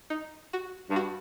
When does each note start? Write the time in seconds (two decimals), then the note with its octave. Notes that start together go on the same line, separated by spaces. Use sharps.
0.10 D#4
0.53 F#4
0.90 G2
0.96 F#4